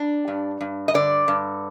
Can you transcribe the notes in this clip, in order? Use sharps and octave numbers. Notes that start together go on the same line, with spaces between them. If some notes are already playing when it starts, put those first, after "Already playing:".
Already playing: D4
G2
G2
D#5
D3 D5
G2